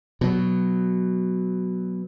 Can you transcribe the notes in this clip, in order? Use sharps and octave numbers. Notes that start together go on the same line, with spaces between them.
B2 F#3